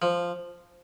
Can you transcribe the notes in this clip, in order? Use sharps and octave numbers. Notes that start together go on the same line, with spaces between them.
F3